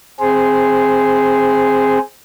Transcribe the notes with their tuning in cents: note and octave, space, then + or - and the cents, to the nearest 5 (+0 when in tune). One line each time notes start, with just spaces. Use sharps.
C4 +10 G#4 +0 C5 -10